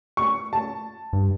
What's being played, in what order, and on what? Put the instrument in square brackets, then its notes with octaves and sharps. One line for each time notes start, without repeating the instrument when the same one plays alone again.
[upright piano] C#6
A5
[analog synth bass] G2